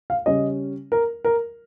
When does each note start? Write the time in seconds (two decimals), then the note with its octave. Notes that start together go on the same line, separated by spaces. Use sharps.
0.10 F5
0.26 C#3 G3 C#4 D#5
0.92 A#4
1.25 A#4